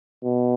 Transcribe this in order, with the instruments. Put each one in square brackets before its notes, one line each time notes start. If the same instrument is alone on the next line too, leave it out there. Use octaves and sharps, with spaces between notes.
[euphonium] B2